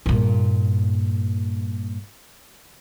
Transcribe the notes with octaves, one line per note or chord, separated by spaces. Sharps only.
G2 A#2